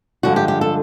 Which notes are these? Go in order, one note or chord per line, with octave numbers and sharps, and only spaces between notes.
G2 D3 F3 G#3 F#4
G4
G4
A4